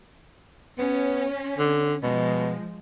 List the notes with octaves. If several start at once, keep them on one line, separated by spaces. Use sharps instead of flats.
B3 C#4
D3
B2 F3 G#3